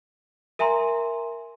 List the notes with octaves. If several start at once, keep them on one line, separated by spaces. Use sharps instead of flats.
A#4 E5 G#5 A#5 C6